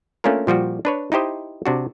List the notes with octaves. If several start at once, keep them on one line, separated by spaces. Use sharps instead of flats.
A3 A#3 C#4 D4 F4 A#4
A#2 F3 G3 F#4
D4 B4 C#5
D#4 E4 G4 C5 D#5
C3 D4 F#4